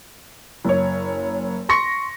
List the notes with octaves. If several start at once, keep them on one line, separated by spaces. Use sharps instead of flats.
F#1 C#5
C6 C#6 A#6 C#7